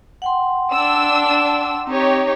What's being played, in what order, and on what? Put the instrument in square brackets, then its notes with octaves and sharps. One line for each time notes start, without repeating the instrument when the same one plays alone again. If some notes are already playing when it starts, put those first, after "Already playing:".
[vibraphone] F#5 G5 C6
[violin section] D4 E6
[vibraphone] C4 [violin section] D#4 G4 C#5